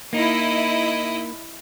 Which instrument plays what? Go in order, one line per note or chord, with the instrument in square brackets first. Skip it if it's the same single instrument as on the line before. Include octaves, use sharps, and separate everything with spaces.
[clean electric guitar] A#3 D#4 [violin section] E4 D#5